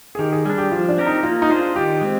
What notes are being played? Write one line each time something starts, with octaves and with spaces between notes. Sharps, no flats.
G#4
D#3 G4
G#4
G3 D4 G#4
G4
F3 F4
D4
C4 G4 A#4
D#4
A#3 F4
D#4
D4 F4 G#4 C5
D#3 G4
G#3 C4